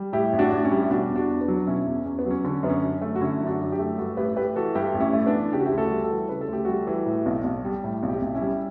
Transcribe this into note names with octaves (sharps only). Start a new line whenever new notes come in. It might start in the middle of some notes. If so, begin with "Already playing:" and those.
Already playing: G3
A2 E4 G4
A1
D4 F#4
A1
C#4 E4
G3
B2 D4 F#4
E2
D4 F#4
E2
B3 D4
F#3
B2 C#4 E4
E2
E2 C#4
B3
F#3
C#4
D3 C#4
F#2 B3
C#4
F#2
A3
F#4
D3 C#4 E4
F#2
D4 F#4
F#2
E4 G4
A3
G2 F#4 A4
A1 G4 B4
A3 G4 B4
E3 F#4 A4
G2 E4 G4
A1
C#4 E4
A3
B3 D4
E3
C#3 G4
F#4
E4 G4
D2
F#4 A4
G3
F#4 A4
E3
C#3 B4
A4
D2 G4
G3 F#4 A4
E3
A2
B1
B1
G3
A2
B1
E4 G4
B1
C#4 E4
G3